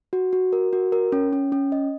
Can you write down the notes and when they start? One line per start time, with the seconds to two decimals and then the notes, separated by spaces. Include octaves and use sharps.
0.13 F#4
0.33 F#4
0.53 A#4
0.73 F#4
0.92 A#4
1.12 C#4
1.33 C#4
1.52 C#4
1.72 D#5